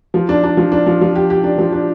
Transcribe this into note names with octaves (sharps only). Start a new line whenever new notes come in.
F3
D4
D4
F3
D4
F3
F3
G4
G4
D4
F3
D4